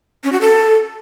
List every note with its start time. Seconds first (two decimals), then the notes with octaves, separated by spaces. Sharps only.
0.24 C#4
0.32 F#4
0.41 A4